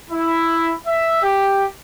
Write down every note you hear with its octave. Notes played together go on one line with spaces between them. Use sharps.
E4
E5
G4